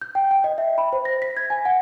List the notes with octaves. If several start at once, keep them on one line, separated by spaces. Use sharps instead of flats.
G6
G5
G5
D#5
E5
B5
C5
A#6
B6
G#6
G#5
F#5